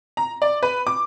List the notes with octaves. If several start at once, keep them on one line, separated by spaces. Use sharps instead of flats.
A#5
D5
B4
D6